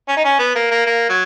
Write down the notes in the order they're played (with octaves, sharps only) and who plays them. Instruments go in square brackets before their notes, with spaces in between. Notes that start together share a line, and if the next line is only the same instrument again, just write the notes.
[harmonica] C#4
D#4
C#4
B3
A#3
A#3
A#3
F#3